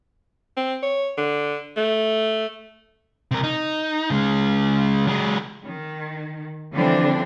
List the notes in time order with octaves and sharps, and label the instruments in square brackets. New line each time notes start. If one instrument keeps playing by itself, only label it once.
[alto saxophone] C4
C#5
D3
A3
[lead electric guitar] C3 A#4
D#4
C#3 G#3
F#3 G#3
[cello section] D#3
D3 E3 F3 G3 C4 D4